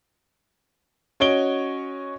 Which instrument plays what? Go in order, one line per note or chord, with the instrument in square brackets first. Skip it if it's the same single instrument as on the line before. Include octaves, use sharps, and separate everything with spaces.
[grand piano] C#4 F#4 C#5 D#5 D7 G7